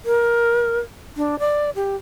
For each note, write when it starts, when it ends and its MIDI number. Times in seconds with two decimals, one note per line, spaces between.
0.05 0.79 70
1.17 1.39 62
1.39 1.70 74
1.75 1.95 67